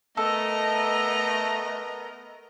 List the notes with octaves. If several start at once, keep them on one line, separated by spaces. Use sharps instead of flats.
A3 B3 A4 A#4 D#5 A#5